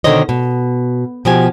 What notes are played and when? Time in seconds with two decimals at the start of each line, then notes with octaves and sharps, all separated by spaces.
0.04 B2 D3 D#3 C5 C#5 D#5
0.29 B2
1.25 B2 F3 G4 G#5